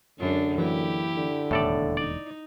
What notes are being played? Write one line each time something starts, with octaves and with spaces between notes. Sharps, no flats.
F#2 D3 G#3 D4
E3 F#3 A#3 E4 G4
D3
E1 D#2 A2 A4 D5
D#4 D5